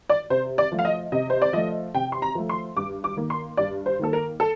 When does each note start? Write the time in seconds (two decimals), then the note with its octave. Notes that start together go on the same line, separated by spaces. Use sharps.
0.10 D5
0.30 C3 C5
0.58 D5
0.72 F3 A3
0.79 F5
0.85 D#5
1.12 C3 D#5
1.30 C5
1.42 D5
1.53 F3 A3 D#5
1.94 C3 G5
2.12 C6
2.22 A#5
2.35 F3 A3
2.49 C6
2.76 G2 D6
3.04 D6
3.16 D#3 A#3
3.30 C6
3.57 G2 D5
3.86 C5
3.99 D#3 A#3 A4
4.13 A#4
4.40 A4